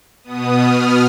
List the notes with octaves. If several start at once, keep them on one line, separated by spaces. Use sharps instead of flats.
B2 B3 D#6
F6